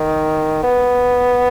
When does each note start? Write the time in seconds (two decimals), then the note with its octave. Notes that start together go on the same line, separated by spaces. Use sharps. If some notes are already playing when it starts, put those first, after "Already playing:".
Already playing: D#3
0.63 B3